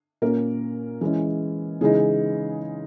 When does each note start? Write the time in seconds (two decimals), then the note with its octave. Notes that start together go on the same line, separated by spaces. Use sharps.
0.22 A#2 A#3 C#4 A#4
1.01 E3 G#3 C#4 G#4
1.81 C#3 E3 G#3 D#4 G#4